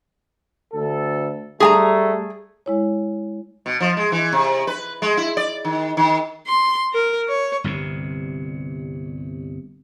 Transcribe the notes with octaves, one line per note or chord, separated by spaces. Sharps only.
D2 A4
G3 A3 G#4 G#5 A#5
G#3 E4 C#5
B2
F3
G#3
E3
C3
B4
G#3
E4
D5
D#3
D#3
C6
A#4
C#5
G1 C2 G2 C3